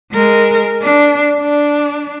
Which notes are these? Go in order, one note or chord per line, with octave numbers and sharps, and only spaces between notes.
G#3 A#4
D4
D4